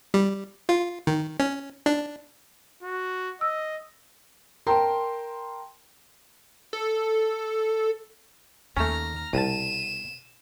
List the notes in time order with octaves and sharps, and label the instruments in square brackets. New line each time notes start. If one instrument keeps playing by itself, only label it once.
[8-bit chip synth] G3
F4
D#3
C#4
D4
[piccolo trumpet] F#4
[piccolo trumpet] D#5 [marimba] E6
[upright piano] A#4 G5 A5 A#5 C6
[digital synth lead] A4
[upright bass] D#2 [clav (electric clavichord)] A3 C#4 [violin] A#5 F6
[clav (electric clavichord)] C2 A5 [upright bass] B2 [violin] D#7 E7